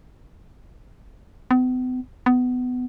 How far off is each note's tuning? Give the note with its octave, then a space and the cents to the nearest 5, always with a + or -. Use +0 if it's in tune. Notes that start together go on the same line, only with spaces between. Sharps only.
B3 +45
B3 +20